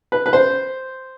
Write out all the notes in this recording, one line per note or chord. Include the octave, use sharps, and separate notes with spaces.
B4
B4
C5